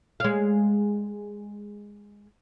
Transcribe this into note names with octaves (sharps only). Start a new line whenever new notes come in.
G#3 F5